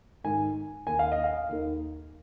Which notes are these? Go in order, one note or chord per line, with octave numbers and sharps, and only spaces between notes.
G#2 D#3 G#5
D#2 D#3 G#5
F5
D#5
F5
D#2 D#3